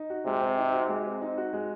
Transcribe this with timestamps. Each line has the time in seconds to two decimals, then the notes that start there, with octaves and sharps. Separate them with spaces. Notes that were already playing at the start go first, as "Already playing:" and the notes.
Already playing: D#4
0.10 F#4
0.26 C3 G#3
0.42 C4
0.58 D#4
0.73 F#4
0.89 G#3
1.06 C4
1.22 D#4
1.38 F#4
1.53 G#3